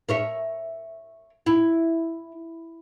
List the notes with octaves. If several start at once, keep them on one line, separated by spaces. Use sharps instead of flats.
A#4 C#5 E5
E4